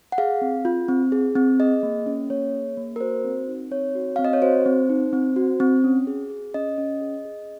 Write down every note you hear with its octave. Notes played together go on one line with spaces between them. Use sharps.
F#5
G#4 F5
C4
F4
C4
G#4
C4
G#4 D#5
A#3
C#4
A#3 C#5
G#4
A#3
A#4
F#4 C5
C4
D#4
C4 C#5
F#4
C4 F5
D#5
C#5
F#4 C5
C4
D#4
C4
F#4
C4
C#4
G#4
G#4
C#4 D#5
C#4
G#4
G#4